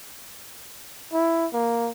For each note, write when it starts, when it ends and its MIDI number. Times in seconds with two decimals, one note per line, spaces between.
1.13 1.47 64
1.53 1.92 58